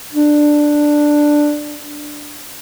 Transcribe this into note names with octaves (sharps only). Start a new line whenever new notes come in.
D4